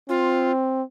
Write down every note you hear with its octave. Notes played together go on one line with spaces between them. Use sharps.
C4 F4